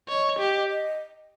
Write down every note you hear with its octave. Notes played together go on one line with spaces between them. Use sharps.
C#5 D#5
G4
D#5